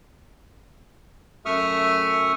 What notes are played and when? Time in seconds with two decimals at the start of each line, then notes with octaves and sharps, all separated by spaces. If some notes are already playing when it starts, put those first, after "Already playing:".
1.45 F#2 A3 E5 C#6 D#6 F6